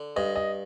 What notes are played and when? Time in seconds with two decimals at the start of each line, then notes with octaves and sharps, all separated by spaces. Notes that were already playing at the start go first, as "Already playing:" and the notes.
Already playing: D3
0.16 G2 D#5
0.36 D#5